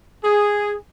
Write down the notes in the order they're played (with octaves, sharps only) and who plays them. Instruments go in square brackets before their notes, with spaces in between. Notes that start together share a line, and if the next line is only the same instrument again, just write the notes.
[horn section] G#4